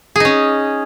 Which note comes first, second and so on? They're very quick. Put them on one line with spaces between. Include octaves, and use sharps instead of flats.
G#4 D#4 C#4